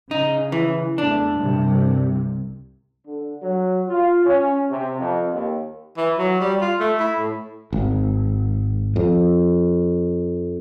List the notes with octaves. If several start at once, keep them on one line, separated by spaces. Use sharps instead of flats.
C#3 D#4
E3
E2 A3 D4
C2 G2 C3
D3
F#3
F4
C#4
C3
F2
D#2
E3
F#3
G3
F4
A3
E4
A2
G#1
F2